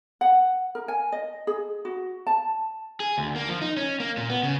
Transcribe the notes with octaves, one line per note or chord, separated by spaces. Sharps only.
F#5
A#4
G#5
D#5
G#4
F#4
A5
G#4
D2
A#3
F3
D#4
C#4
A#3
A#2
B3
C#3